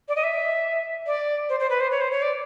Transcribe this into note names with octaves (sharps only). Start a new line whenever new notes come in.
D5
D#5
E5
D5
C5
C5
B4
C5
C#5
C5
C#5
D5